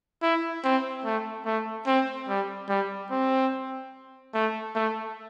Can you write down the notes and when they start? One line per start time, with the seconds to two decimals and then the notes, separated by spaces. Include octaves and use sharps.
0.22 E4
0.64 C4
1.05 A3
1.46 A3
1.86 C4
2.28 G3
2.69 G3
3.11 C4
4.34 A3
4.75 A3